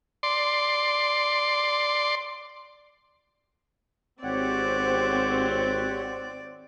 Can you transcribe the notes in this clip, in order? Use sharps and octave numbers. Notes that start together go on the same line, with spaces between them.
D5 C6
G#1 C4 G4 C#5 D5 F#5